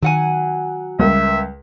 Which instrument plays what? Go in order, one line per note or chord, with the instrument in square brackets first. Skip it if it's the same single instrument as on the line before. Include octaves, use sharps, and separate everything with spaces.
[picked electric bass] D#3 [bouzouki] F#3 F#5 G#5
[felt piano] C#2 A#4 [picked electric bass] G3 [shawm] E5